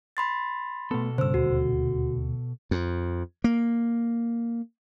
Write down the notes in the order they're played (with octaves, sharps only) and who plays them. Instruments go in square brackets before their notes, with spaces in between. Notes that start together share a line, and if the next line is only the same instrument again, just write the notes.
[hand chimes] B5 C6 A6
[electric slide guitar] B2 A4 [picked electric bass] A3 B3
[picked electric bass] G2 C#3 [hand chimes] C5 E6
[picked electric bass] D#1 D2 [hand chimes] F#4
[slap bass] F2
A#3